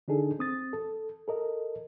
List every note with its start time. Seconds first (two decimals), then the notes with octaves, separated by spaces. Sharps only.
0.08 D3 D4 D#4 G#4 A4
0.39 C4 D#6 A6
0.73 A4
1.28 A4 A#4 D#5